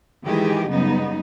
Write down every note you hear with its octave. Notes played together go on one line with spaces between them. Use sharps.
D#3 E3 G#3 G4 G#4
F#2 C#3 G3 B3 D#4